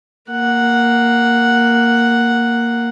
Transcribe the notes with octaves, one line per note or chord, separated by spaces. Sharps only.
A#3 F#5